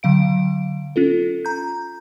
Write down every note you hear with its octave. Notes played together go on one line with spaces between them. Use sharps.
D3 F#3 F5 D7
C#4 F4 A4
A#5 G6